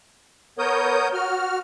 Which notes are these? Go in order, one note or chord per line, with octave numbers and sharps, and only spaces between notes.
B3 A#4 C#5 D#6 G6
F#4 F6